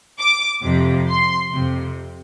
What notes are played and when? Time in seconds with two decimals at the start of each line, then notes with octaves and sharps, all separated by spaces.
0.20 D6
0.64 F2 C3
1.08 C6
1.53 F2 C3